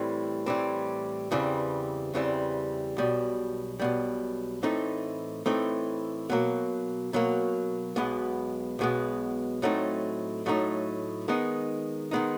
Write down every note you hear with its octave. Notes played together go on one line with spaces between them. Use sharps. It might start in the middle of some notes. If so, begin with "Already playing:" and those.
Already playing: A2 E3 G3 C4
A2 E3 G3 C4
E2 C#3 E3 G3 C4
E2 C#3 E3 G3 C4
B1 B2 G3
B1 B2 G3
A2 E3 A3 C4 D#4
A2 E3 A3 C4 D#4
B2 F#3 A#3
B2 F#3 A#3
B1 B2 G#3 B3
B1 B2 G#3 B3
A2 F#3 A3 C4 D#4
A2 F#3 A3 C4 D#4
D#3 G#3 B3 D#4
D#3 G#3 B3 D#4